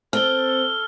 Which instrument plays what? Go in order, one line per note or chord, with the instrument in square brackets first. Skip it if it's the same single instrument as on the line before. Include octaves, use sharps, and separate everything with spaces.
[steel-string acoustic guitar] C4 [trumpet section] A4 [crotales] F6 G7